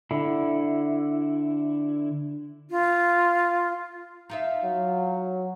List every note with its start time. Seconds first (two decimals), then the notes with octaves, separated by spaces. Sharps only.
0.11 D3 E4
2.70 F4
4.29 D#4 F4 E5
4.64 F#3